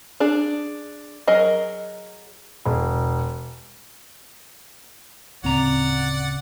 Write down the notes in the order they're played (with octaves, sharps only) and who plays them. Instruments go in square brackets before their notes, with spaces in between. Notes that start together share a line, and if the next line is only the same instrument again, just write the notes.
[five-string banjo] D4 G#4
F#3 G#4 A#4 D#5
[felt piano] E1
[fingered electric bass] D1 C4 [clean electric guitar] C#3 A#5 [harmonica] D5 F#5